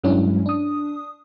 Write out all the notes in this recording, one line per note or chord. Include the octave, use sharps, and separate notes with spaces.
G2 F#3 G#3 C#4 D4 E4
D4 D#6